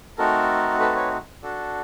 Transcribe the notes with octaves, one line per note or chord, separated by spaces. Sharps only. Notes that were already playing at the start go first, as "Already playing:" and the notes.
A3 C4 D#4 F#4 A4 A#4
A4 B4
B4 C#5
D4 F#4 A4